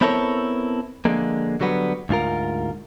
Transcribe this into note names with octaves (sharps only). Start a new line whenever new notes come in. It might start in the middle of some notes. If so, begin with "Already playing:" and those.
B3 C4 E4 A4 A#4 C#5
D3 F3 G#3 A#3
D3 F#3 G3 B3
D2 G#2 F4 A#4